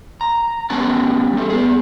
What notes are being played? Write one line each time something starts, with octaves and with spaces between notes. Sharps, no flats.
A#5
G3 B3 C#4 F#5 A5
G3 A3
B3 G#4